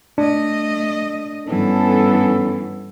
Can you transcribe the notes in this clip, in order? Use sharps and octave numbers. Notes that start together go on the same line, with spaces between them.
A3 D4 D#5
G2 E3 B3 C#4 A4